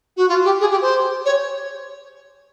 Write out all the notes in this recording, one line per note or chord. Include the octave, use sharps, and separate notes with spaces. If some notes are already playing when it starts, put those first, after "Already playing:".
F#4
F4
G4
G#4
G4
C5
C#5